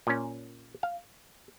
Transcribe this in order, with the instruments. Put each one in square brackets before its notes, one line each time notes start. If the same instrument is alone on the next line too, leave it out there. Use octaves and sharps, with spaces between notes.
[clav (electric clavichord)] A#2 C#4
F5